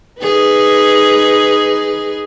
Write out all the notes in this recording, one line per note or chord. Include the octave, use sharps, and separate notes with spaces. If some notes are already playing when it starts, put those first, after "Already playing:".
D#4 G#4 B4